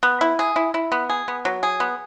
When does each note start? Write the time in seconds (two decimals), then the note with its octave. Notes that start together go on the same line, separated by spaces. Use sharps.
0.03 B3
0.21 E4
0.39 G#4
0.56 E4
0.74 E4
0.92 B3
1.10 G#4
1.28 B3
1.45 F#3
1.63 G#4
1.80 B3